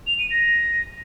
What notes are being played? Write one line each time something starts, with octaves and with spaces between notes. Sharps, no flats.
F7
D#7
A#6